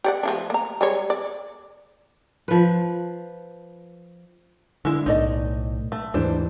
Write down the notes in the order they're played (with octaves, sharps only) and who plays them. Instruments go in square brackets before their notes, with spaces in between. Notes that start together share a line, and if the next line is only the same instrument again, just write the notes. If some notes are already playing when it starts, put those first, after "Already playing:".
[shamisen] G4 D5 F#5
F3 A3 D4
A#3 A#5
G3 G#3 C#5
D5
[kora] F3 B4
[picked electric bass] D3 [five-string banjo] G#3 E4
[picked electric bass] B1 A2 [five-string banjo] D#4 D5 D#5
[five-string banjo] A3
[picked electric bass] D#2 G#2 E3 [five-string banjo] D4 C5